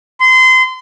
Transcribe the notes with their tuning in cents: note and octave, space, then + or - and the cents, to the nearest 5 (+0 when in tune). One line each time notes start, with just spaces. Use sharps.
C6 -25